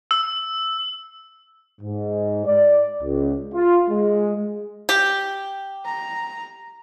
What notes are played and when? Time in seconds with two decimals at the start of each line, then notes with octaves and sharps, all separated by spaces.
0.11 E6
1.81 G#2
2.46 D5
3.02 C#2
3.54 F4
3.89 G#3
4.89 G4
5.85 A#5